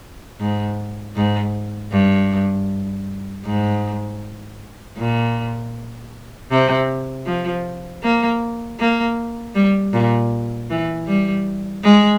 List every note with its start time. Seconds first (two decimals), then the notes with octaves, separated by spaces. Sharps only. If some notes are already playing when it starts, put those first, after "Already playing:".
0.40 G#2
1.15 G#2
1.92 G2
3.45 G#2
4.97 A#2
6.50 C3
7.26 F3
8.03 A#3
8.79 A#3
9.55 G3
9.93 A#2
10.70 E3
11.07 G3
11.84 G#3